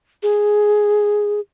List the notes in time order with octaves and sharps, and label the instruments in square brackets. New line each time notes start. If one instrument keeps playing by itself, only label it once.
[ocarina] G#4